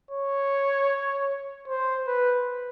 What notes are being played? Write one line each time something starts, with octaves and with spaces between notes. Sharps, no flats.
C#5
C5
B4